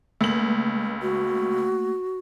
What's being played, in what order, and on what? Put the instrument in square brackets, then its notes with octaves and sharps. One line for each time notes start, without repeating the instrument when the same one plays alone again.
[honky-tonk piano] C#2 F#7 [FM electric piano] A3 A#3
[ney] F#4